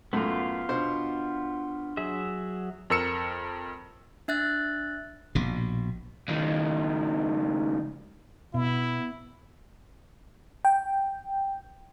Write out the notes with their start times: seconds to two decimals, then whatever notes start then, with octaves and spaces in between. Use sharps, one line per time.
0.13 F#2 A2 A3 B3 F4
0.69 B2 D4 C5 C6
1.97 F#3 G#4 E5
2.90 F2 A#4 E6 C#7 E7
4.28 D4 E5 F#6 A6
5.35 A#1 B2
6.28 C#2 D#3
8.54 B2 B3 E4
10.65 G5